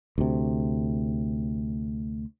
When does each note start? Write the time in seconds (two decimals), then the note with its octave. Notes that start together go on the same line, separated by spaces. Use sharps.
0.18 D2 C3